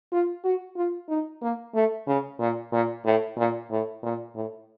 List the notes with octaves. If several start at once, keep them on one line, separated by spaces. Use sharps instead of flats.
F4
F#4
F4
D#4
A#3
A3
C#3
A#2
A#2
A2
A#2
A2
A#2
A2